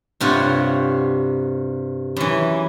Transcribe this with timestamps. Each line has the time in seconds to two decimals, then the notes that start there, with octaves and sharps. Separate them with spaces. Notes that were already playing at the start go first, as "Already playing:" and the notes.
0.21 G2 C3 F4 F#4 C#5
2.16 F#2 E3